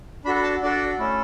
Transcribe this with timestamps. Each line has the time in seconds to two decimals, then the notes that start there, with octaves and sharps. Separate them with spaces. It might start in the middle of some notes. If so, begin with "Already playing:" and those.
0.25 D4 F#4 A4 B5
0.35 B5
0.43 A5
0.63 D4 F#4 A4 D5
0.99 A3 C#4 E4 A4